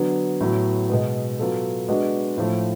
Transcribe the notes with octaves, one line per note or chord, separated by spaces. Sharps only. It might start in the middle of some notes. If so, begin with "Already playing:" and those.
Already playing: D3 F#3 B3
A2 F#3 B3
B2 G#3 B3
F#3 B3 F4 A4
G#3 B3 D4 F#4
A2 F3 A3